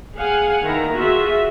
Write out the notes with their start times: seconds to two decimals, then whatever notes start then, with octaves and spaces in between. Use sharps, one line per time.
0.17 G#4 F5 F#5 G#5
0.64 D#3 B3 E4 A#5
0.96 F4 F#4 G#4 E5